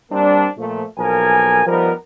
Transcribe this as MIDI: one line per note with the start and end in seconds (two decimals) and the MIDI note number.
0.12 0.46 55
0.12 0.46 58
0.12 0.46 60
0.12 0.46 62
0.57 0.83 46
0.57 0.83 53
0.57 0.83 57
0.98 1.64 35
0.98 1.64 53
0.98 1.64 58
0.98 1.64 70
0.98 1.64 80
1.67 1.91 53
1.67 1.91 55
1.67 1.91 59
1.67 1.91 63
1.67 1.91 70